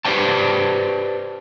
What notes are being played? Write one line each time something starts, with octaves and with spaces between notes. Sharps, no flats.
G4 B4 C5 D5 G5 A5